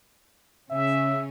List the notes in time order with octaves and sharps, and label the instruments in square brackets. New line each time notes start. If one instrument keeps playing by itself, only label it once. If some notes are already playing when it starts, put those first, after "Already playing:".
[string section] C#3 C#4 [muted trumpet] E5